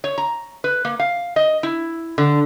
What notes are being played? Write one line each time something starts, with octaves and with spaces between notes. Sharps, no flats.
C#5
A#5
B4
A#3
F5
D#5
E4
D3